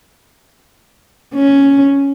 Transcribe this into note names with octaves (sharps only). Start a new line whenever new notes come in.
C#4